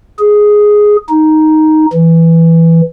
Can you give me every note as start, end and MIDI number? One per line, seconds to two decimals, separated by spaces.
0.19 0.96 68
1.09 1.86 63
1.93 2.81 52